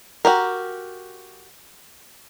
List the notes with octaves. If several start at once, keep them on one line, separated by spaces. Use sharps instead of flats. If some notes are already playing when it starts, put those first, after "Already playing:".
F#4 G4 A#4